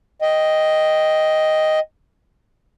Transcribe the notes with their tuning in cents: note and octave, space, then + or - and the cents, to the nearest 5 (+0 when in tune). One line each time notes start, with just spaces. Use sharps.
D#5 +5 G5 +0